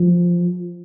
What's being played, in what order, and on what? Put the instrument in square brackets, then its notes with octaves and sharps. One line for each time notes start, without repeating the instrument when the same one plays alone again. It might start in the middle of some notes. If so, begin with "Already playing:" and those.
Already playing: [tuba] F3